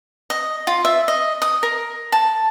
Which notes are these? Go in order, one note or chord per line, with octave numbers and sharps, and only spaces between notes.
D#5
F4
E5
D#5
D#6
A#4
A5